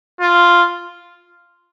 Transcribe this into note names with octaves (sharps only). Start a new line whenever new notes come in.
F4